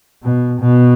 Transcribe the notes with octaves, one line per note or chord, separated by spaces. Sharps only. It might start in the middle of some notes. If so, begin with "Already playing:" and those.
B2
B2